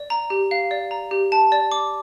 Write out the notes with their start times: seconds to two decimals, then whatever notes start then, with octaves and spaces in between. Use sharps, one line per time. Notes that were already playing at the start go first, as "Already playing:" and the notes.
Already playing: D5
0.10 A#5
0.30 G4
0.51 F5
0.71 D5
0.91 A#5
1.11 G4
1.32 A5
1.52 D5
1.72 D6